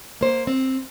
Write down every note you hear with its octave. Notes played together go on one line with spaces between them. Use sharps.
A#3 C5
C4